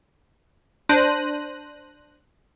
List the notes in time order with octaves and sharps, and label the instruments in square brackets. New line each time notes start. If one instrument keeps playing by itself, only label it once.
[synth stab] D4 C5 F#6 A#6 D#7